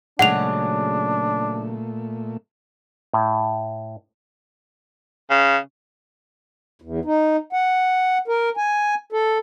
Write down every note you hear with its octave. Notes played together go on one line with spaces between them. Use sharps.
A#2 C#3 F#3 G#3 A3 D4 F#5 F7
A2
C#3
E2
D#4
F#5
A#4
G#5
A4